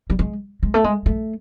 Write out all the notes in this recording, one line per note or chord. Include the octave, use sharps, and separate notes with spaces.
G3
G#3
G#3
A3
G#3
A3